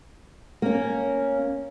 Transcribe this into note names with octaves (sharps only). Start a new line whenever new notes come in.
A#3 C#4